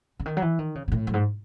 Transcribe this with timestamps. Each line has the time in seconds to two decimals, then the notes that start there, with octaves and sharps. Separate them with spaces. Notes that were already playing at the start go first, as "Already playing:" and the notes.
0.20 C#3
0.26 D#3
0.37 F#3
0.42 E3
0.59 D#3
0.75 C#3
0.88 B2
0.92 A2
1.07 F#2
1.14 G#2